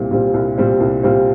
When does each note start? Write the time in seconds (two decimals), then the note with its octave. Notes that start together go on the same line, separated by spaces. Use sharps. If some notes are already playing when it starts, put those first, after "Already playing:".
Already playing: C2 A#2 G3 C4
0.11 A#2 G3 C4
0.34 C2
0.58 A#2 G3 C4
0.80 C2
1.03 A#2 G3 C4